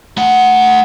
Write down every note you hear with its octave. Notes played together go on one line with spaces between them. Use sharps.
A3 F#5